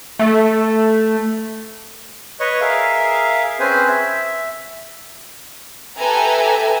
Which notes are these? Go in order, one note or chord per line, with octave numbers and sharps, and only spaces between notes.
A3
B4 C#5 D#5 C#6
G#4 A#4 E5 F5
C4 C#4 G#4 B4 C5 G#5
E5
G4 A4 B4 E5 G#5 A#5